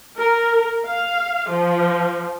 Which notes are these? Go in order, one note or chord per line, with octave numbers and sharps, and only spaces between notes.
A#4
F5
F3